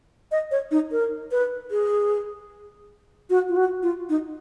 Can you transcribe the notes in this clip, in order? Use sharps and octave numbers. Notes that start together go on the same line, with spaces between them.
D#5
C#5
D#4
A#4
B4
G#4
F#4
F4
F#4
F4
D#4